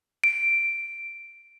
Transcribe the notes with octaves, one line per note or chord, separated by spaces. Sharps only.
D7